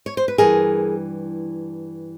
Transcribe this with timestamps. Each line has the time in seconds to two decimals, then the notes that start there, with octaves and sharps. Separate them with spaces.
0.06 C#5
0.17 C5
0.28 B4
0.38 G2 E3 G3 G#4 A#4